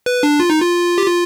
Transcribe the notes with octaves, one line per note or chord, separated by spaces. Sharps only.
B4
D4
F4
D#4
F4
G4
F4